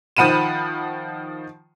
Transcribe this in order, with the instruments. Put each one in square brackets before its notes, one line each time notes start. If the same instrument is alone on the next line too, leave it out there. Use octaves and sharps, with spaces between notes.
[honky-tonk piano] D#3 F3 F#5 B5 D#7 E7